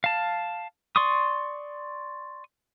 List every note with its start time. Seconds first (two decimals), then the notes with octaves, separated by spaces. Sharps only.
0.04 F5 A5
0.96 D5 C6 C#6 D#6